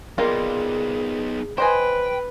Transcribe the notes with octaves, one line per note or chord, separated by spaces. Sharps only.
G3 A#3 B3 D#4 F4 G#4
B4 C5 D#5 G5 G#5